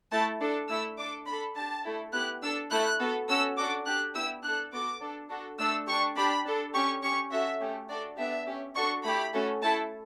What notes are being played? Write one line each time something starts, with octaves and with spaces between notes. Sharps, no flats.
A3 E4 A4 A5
D4 A4
A3 E4 A4 E6
D4 A4 D6
D4 A4 B5
D4 G4 A5
A3 E4 A4
B3 E4 G4 F#6
D4 A4 E6
A3 E4 A4 F#6
B3 F#4 A4
C#4 F#4 A4 E6
D4 F#4 A4 D6
D4 G4 F#6
B3 E4 G4 E6
D4 A4 F#6
B3 F#4 A4 D6
D4 A4
D4 F#4 A4
A3 D4 A4 E6
D4 G4 C#6
D4 G4 B5
D4 A4
C#4 G4 C#6
C#4 G4 C#6
C#4 F#4 A4 E5
A3 C#4 G4
D4 F#4 A4 D5
B3 D4 G4 E5
C#4 G4
D4 F#4 A4 C#6
A3 E4 G4 B5
A3 C#4 F#4 A4
A3 E4 A4 A5